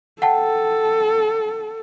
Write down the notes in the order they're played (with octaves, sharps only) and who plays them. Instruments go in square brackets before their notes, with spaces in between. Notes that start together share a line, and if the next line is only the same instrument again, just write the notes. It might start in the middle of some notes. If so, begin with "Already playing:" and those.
[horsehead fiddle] A4 [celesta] F#5 G5 A5